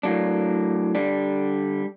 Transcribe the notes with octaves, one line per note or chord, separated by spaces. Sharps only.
A2 F#3 A#3 D4
D3 G3 D4